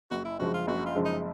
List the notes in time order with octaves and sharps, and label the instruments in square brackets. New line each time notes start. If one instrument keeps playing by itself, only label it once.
[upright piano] F#1 [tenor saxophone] F#4
[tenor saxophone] E4
[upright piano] F#2 C#3 F3 G#3 [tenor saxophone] F#4
[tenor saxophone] F4
[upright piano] F#1 [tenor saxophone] F#4
[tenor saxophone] F4
[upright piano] F#2 C#3 F3 G#3
[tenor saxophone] D#4